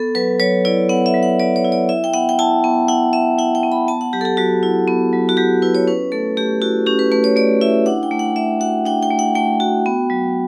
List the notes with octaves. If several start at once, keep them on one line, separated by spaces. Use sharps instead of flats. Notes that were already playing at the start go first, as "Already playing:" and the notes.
Already playing: B3 A4
F#3 B4
F#3 C#5
E4 D5
B3 F#5
E5
F#3
F#5
F#3 D5
C#5
E4
D5
E4 E5
G5
B3 F#5
G5
E4 A5
B3
E4 F#5
B3 E5
E4 F#5
G5
B3
B5
B3 A5
F#5
F#3 G4
A4
G4
F#3 F#4
E4
B3
F#3
F#4
F#3 G4
E4 B4
C#5
C#4 B4
A3 A4
A3 G4
E4 F#4
C#4 G4
B4
A3 B4
C#5
A3 D5
E4 E5
D4 F#5
G5
A3
F#5
A3 E5
F#4 F#5
D4 G5
G5
A3
F#5
A3 G5
F#4
B3
F#3